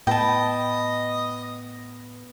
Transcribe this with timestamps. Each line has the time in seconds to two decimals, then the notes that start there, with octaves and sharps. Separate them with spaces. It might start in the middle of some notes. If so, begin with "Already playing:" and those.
0.07 A2 B3 B4 D#5 G5 A5 D#6